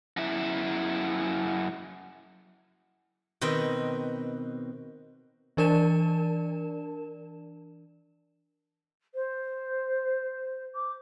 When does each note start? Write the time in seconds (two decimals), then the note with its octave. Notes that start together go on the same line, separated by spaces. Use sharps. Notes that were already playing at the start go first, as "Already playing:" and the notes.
0.17 F#2 E4
3.41 B2 D#3 C4 B4 D#5
5.57 E3 D4 A#4 D5 A5 E7
9.15 C5
10.75 D6